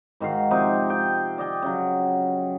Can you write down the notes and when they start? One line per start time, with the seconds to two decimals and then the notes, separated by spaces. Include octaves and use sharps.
0.20 G#2 D#3 F#4 F5
0.51 C3 F3 D#4 C#6
0.90 G5
1.38 D5 D#5 G5 G#5
1.62 C#3 F#3